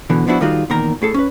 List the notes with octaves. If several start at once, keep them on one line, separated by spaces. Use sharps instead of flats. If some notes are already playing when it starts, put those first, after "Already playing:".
B2 D3 E3
F3 B3 D4 E4 F#4
D#3 G3 D#4 F4 F#4 G#4
E2 A#2 D#3 A#4 A#5
A2 G#4 A4
C#4 B4